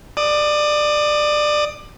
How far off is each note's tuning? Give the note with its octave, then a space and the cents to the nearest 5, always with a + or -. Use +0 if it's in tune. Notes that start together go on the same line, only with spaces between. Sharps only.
D5 +20 D#6 +0